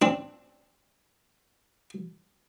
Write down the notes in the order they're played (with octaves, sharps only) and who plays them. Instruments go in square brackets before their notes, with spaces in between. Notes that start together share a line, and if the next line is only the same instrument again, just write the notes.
[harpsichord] C4 D4